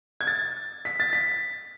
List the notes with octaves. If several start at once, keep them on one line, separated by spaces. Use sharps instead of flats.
G#6
A6
B6
A6
B6